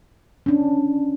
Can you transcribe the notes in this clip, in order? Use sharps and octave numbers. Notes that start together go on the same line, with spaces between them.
C#4 D4